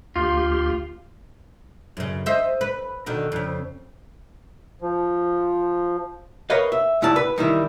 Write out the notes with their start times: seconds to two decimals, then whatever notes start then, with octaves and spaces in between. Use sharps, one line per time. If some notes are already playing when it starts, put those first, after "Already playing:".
0.16 D2 F4 G4 C6
1.97 F#2 C#3
2.26 C5 D#5 E5
2.61 B4
3.06 B2 D3 D#3
3.32 F2 C#3
4.81 F3
6.50 A#4 B4 C#5 D#5 F5
6.72 E5
7.02 C#2 G#2 E4 D5 A5
7.16 B4
7.38 D#3 E3 G3 E4